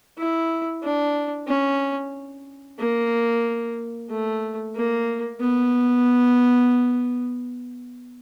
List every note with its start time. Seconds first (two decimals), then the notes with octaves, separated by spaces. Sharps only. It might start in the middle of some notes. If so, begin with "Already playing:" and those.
0.19 E4
0.83 D4
1.48 C#4
2.79 A#3
4.10 A3
4.76 A#3
5.40 B3